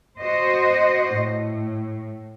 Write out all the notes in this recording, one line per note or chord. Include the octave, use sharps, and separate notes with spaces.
F#4 C5 D#5
A2